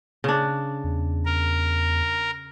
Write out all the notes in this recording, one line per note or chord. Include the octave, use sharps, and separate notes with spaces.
C#3 D4
E2
A#4